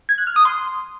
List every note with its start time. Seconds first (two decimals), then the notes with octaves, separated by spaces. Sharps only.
0.09 G#6
0.18 F#6
0.27 F6
0.36 D#6
0.45 C6